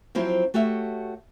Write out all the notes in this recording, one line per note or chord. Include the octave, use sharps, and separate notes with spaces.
F3 F#3 C4 E4
A3 F#4 G4 C#5 E5